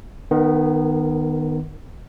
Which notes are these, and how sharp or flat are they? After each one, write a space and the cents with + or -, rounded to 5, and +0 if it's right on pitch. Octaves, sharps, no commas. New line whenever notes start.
D#3 -25 B3 +0 A#4 +15